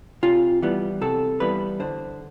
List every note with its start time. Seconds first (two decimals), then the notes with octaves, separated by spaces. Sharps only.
0.23 C3 F4
0.62 E3 G3 B3
1.01 C3 A4
1.40 E3 G3 B3 B4
1.80 D3 C5